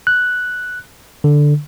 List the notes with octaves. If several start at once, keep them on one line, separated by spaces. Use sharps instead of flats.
F#6
D3